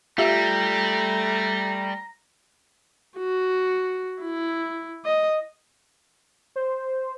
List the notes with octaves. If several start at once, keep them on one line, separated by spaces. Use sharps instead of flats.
G3 A3 F4 G4 E5 A#5
F#4
E4
D#5
C5